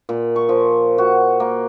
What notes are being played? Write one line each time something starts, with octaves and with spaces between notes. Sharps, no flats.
A#2
C#6
F3
F#4
A#3